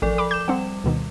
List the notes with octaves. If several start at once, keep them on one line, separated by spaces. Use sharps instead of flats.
A1 F3 A4 D5
B5 D6
D6 G6 E7
G3 C4 F#5
D2 B2 D#3